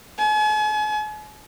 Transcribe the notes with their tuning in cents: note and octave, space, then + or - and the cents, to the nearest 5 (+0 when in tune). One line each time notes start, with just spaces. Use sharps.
G#5 +40